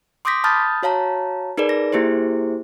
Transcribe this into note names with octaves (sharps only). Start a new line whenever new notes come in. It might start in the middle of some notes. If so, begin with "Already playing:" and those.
C6 D6 D#6 G6 A#6 B6
A5 B5 D#6 F6 G6 A6
F#4 C#5 F5 A5 A#5
D#4 G#4 A#4 B4 D5
A#6
A#3 E4 G4 G#4 C5